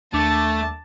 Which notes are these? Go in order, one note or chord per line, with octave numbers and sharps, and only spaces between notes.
D#2 A3 D4 A5 D6